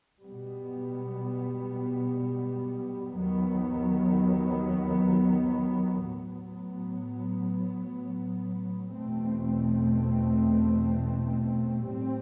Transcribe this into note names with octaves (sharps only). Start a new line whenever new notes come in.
B2 G3 B3
D#2 D#3 F#3 B3
A2 F#3 B3
E2 B2 A3 C4
A2 G3 C4